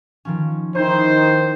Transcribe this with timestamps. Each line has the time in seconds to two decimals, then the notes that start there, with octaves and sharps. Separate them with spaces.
0.25 D#3 F3 C#4
0.75 D#3 D#4 E4 C5